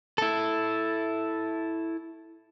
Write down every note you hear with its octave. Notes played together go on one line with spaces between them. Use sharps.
E4 A4